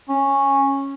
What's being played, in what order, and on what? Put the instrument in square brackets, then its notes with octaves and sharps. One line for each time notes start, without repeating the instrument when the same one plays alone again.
[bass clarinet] C#4